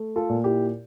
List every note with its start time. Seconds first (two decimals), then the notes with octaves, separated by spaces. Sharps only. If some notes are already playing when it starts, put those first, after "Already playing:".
Already playing: A3
0.16 F4 A4
0.29 A#2
0.44 E4 G4